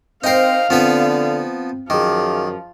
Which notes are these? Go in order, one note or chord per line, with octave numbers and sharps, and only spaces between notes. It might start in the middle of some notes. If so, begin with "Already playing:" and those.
C4 D#4 A#4 C5 F5 G5 C7
D3 F3 B3 C4 B4
F#2 D#3 F3 G#4 D6